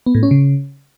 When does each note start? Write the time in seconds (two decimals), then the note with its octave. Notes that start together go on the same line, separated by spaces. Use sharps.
0.06 B3
0.15 A2
0.23 C#4
0.31 C#3